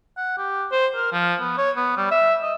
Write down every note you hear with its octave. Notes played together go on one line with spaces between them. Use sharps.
F#5
G4
C5
A#4
F3
B3
C#5
B3
G3
E5
D#5